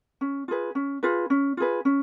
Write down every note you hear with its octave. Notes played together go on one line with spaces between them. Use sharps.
C#4
F4 G#4 B4
C#4
F4 G#4 B4
C#4
F4 G#4 B4
C#4